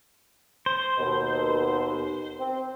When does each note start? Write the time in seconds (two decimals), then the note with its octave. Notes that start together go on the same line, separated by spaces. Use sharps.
0.66 C5
0.98 D#2 B2
2.39 C4